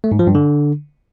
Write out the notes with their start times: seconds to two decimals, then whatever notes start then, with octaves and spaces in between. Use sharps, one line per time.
0.04 A3
0.12 G#2
0.19 F3
0.27 G2
0.35 D3